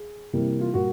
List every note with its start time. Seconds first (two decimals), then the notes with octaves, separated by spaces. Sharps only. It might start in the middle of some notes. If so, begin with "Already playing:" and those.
Already playing: G#4
0.33 C3 E3 G3 A#3
0.61 F4
0.74 A#2 G3 A#3 F#4